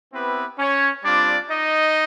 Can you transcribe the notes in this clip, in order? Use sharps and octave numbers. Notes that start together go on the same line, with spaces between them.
B3 C4 E4 G4 B4
C#4 C#5
G3 C4 D4 F4 D5
D#4 D#5